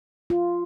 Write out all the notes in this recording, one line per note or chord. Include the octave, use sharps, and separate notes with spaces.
F4